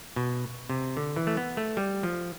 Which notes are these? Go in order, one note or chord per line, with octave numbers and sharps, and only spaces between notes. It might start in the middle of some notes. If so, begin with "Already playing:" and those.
B2
C3
D3
E3
A3
B3
A3
G3
F3